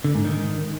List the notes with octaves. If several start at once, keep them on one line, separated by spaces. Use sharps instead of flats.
D3
G#2
D#3